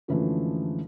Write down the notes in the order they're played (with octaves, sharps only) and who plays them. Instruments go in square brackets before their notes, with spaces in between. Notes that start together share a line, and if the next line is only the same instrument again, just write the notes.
[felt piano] F#2 D3 E3 F3 G#3 A3